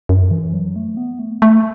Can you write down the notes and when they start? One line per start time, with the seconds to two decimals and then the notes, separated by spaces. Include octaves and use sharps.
0.09 F#2
0.31 E3
0.53 F#3
0.76 A3
0.97 B3
1.19 A3
1.42 A3